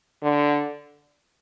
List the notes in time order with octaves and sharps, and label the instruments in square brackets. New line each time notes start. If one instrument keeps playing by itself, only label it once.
[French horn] D3